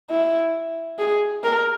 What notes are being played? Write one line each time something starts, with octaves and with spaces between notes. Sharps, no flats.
E4
G#4
A#4